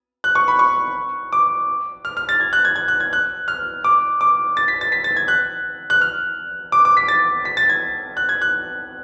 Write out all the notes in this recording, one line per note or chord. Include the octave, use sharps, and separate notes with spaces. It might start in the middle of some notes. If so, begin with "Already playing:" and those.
F#6
C#6
B5
C#6
D6
F6
F6
A6
G#6
F#6
G#6
G#6
F#6
G#6
F#6
F6
D6
D6
A6
B6
A6
B6
A6
G#6
F#6
F#6
F6
D6
D6
B6
A6
B6
A6
G#6
F#6
G#6
F#6